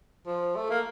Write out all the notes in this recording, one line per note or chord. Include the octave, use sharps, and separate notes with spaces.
F3
A3
A#3